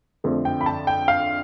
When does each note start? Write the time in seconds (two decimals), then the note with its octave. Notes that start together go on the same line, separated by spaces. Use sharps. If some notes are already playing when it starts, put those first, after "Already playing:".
0.24 F2 D3 F3 A3
0.45 G5
0.61 B5
0.66 A5
0.87 G5
1.08 F5